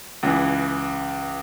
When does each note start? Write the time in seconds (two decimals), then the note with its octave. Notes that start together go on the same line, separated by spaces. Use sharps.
0.23 C#2 C#3 E3